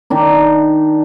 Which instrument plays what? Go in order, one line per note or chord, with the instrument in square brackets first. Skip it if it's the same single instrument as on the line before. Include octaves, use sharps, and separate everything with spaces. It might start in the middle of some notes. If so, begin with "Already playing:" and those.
[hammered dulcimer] D#3 D4 D#4